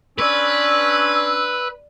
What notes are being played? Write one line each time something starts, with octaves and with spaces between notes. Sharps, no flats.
C#4 D4 B4 D5 C6 E6